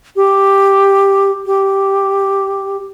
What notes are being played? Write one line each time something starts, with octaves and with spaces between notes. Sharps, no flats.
G4
G4